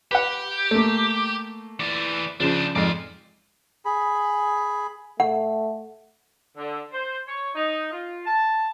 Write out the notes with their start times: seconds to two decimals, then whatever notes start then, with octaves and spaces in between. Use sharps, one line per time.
0.11 G4 B4 F#5
0.71 A3 A#3
1.80 E3 D5
2.40 C#3 F3 D4 C5
2.75 F2 G#2 D5 F5
3.85 G#4 B5
5.20 A3 F#5
6.56 D3
6.93 C5
7.27 C#5
7.55 D#4
7.92 F4
8.25 A5